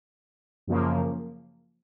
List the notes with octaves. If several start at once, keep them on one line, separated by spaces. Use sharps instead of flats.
F#2 C#3 F3 A#3